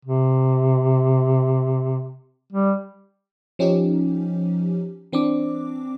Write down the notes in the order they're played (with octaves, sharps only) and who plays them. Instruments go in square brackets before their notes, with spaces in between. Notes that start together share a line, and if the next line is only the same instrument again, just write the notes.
[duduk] C3
G3
[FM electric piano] F3 C#4 D#4 G4
E3 C4 D4 D6